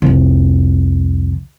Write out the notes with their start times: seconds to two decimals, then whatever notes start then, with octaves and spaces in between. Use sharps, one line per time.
0.02 C2 F2